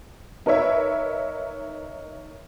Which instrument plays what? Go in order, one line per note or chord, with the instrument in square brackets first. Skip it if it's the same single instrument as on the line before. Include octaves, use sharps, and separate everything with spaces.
[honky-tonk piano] D#4 A#4 B4 C#5 E5